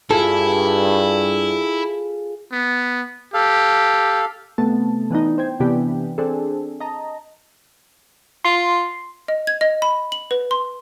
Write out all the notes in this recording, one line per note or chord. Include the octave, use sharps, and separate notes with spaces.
G2 E4 F4 G#4 A4
B3
G4 A4 F5
C3 A3 B3 A5
E3 B3 D4 D#4
C5 G5 G#6
C3 E3 B3 D4 G4
C4 D4 G#4 A4
D#5 A5 A#5
F4 C6
D#5
G#6
D#5
B5
F#7
B4
C6